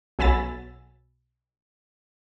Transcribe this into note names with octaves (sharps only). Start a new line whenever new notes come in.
B1 F#3 G#5 B5 E6 A6